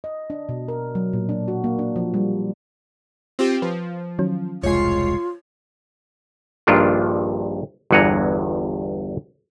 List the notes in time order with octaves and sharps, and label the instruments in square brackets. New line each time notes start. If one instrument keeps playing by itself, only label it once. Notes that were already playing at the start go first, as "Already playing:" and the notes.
[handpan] D#5
D4
B2
A#4
F#3
A#2
D4
F#4
A#3
D4
F3
G3
[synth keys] C4 F4 G4
[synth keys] F3 [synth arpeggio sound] B4
[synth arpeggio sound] D#3 F#3 C#4
[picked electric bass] E1 C2 G#3 [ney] F4 [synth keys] C#5 C7
[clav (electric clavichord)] A#1 G2 A#2 D#3 D4 F4
G1 E2 G2 F#5 G#5 A#5